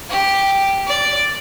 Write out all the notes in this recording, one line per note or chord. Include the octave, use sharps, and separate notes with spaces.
G4
D5